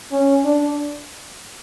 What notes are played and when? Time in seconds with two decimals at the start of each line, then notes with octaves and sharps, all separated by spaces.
0.12 C#4
0.45 D4